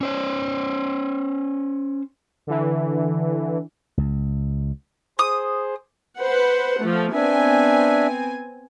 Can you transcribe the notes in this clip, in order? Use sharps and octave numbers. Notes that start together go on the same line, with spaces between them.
C#4 C5 C#5
D3 E3
C#2
G#4 C5 D#6
B4 C5 F#5
F3 A3
B3 C4 D4 E5 G#5